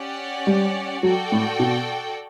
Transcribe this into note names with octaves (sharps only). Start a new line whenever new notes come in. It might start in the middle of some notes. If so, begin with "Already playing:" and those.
Already playing: C#4 G4 D5 F#5
G3
F#3 F#4 A4 D5 G5
A2
B2